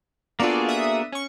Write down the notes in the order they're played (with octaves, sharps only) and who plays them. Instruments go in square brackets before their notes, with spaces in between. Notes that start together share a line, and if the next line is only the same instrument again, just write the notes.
[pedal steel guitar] A#3 F#4 G#4 [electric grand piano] B3 D4 A4 [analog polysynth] F4 D5
[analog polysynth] E5 D#6
C#4 C#6